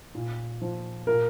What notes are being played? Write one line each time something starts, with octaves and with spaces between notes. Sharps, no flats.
A#2
F3
A#2 A#4